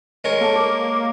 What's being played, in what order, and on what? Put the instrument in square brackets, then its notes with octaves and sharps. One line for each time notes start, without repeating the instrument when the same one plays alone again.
[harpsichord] G#3 A#4 C#5
[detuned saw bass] A#3 [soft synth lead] A4
[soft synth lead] D6
D6